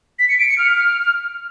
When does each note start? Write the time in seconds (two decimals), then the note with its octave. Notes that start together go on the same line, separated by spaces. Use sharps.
0.19 B6
0.29 C#7
0.39 D7
0.48 C#7
0.58 F6